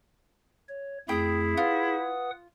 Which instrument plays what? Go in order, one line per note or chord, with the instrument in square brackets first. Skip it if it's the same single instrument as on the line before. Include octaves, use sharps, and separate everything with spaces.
[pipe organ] C#5
[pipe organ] F2 A3 [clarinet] E4 [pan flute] G#4 [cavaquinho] G5 D#6
[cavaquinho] F4 [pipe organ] B4 F#5 D#6